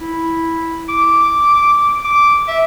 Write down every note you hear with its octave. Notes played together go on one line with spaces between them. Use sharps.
E4
D6
D6
E5